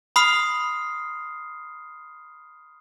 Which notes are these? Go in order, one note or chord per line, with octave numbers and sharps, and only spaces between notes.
B5 C6 D#6 F6 C7